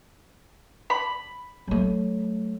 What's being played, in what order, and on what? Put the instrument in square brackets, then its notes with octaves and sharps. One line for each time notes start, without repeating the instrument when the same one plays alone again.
[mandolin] B5
[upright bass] F#3 A3